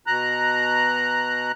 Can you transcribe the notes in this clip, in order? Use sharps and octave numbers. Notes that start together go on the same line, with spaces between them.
B2 A#5 F#6